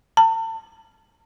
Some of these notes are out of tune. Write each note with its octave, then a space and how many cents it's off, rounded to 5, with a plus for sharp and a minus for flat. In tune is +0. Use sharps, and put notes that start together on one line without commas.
A5 +35